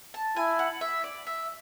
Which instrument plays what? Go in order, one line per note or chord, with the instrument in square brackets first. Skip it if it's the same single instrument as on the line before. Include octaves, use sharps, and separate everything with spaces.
[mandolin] A5
[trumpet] E4 [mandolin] G#5
[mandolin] F#5
E5
D5
E5